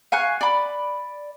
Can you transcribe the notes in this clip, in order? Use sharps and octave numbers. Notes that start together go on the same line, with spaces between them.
F5 G#5 C#6 F#6
D5 B5